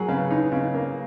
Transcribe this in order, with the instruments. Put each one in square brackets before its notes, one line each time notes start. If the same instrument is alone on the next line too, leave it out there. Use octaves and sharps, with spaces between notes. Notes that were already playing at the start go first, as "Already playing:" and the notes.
Already playing: [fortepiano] F#3 [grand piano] G#4 A#4
[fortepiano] C#3 [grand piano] B4
[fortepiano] D#4
C#3
A#3